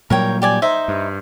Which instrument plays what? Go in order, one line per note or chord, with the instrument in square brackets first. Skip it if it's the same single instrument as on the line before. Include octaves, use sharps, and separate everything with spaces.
[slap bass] A#2 F#3 G3 [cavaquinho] A#4 C#5 G5
[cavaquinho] G4 D5 G#5
D#4 C5 E5
[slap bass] G2